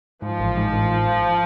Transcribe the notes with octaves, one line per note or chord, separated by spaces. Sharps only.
G#2 F3
A1
G#2
A1